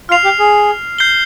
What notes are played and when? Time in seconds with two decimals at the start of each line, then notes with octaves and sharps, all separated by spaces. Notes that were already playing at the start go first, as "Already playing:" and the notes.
0.09 F4 F6 C7 F7
0.24 G4
0.39 G#4
0.99 G6 C7 G7